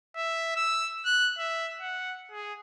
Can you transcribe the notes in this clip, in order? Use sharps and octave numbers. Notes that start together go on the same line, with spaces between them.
E5
E6
F#6
E5
F#5
G#4